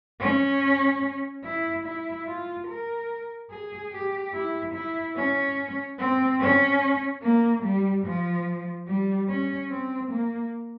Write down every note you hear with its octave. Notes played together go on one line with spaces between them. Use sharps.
C#4
E4
E4
F4
A#4
G#4
G4
E4
E4
C#4
C4
C#4
A#3
G3
F3
G3
C#4
C4
A#3